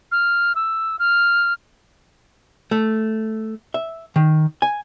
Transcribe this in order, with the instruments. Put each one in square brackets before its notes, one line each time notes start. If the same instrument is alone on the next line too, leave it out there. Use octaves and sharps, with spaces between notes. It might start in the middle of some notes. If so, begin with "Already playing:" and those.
[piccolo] F6
E6
F6
[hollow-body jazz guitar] A3
E5
D#3
G#5